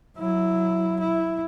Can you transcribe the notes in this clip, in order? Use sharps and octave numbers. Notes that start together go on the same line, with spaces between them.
F#3 E4
E4